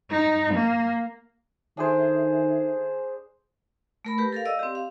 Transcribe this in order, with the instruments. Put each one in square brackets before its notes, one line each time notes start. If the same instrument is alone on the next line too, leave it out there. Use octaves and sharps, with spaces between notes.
[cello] D#4
A#3
[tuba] D#3 [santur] D4 G#4 C5 [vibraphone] A4 E5
[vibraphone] A3 A#4 B5
G4 A#4 B4
A4 A#4 F5
D5 D#5 F5 E6
C4 G4
F5